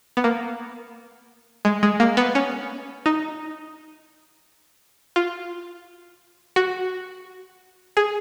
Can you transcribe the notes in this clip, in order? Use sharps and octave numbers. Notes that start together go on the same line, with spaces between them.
B3
A#3
G#3
G#3
A#3
B3
C#4
D#4
F4
F#4
G#4